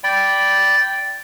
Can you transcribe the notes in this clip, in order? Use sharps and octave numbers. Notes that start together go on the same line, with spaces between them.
D5 G5 B5